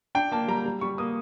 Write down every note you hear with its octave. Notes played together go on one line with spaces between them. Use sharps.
D4 G5
A#3 A5
G3 A#5
G3
G3 C#6
A#3 D#6